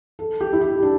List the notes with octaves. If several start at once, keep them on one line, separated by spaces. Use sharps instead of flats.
A4
G4
E4
G4
D4